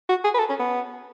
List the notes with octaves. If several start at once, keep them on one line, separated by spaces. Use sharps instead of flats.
F#4
G#4
B4
A4
C#4
B3